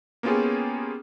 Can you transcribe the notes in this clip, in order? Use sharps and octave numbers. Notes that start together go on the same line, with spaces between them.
A#3 B3 C#4 F4 G4 G#4